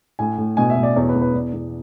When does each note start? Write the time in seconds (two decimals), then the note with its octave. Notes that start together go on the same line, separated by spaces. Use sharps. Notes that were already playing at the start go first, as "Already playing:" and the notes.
0.19 A2 G#5
0.38 A2
0.57 B2 G#5
0.70 E5
0.76 B2
0.83 D5
0.96 E2 C#5
1.09 B4
1.15 E2
1.22 B4
1.33 E2 D5
1.53 E2